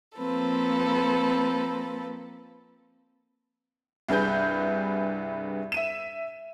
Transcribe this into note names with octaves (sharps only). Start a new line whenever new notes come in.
F3 A#3 C4 A4 B4
C2 G2 G#4 B4 G6
E5 D#7 E7